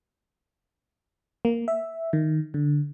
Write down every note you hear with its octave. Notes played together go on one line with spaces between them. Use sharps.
A#3
E5
D#3
D3